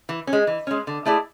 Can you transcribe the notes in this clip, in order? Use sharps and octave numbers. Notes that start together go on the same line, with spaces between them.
E3
C#4
G#3
E3
G#3 C#4
D3
A3 E4 G#4 D5